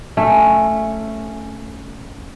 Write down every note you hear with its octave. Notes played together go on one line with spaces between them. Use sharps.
A3 C#4